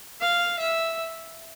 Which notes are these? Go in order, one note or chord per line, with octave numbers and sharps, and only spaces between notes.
F5
E5